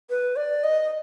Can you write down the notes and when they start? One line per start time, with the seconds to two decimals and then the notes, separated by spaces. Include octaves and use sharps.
0.10 B4
0.36 D5
0.64 D#5